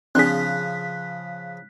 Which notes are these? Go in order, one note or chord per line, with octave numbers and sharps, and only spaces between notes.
C#3 F3 C4 D4 G#4 F#6 B6